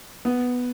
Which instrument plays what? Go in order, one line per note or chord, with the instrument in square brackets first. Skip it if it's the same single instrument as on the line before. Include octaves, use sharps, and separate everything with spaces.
[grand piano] B3